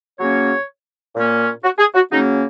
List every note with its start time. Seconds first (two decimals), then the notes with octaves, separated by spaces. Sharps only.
0.19 C#3 F#3 A#3 C#4 C#5
1.15 A#2 A#3 C#4
1.63 F#4
1.79 G#4
1.95 F#4
2.11 C#3 F#3 A#3 C#4 D#4